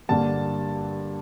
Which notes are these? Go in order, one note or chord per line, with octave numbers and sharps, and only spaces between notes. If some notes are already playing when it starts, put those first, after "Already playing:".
G2 D3 G3 A#3 A5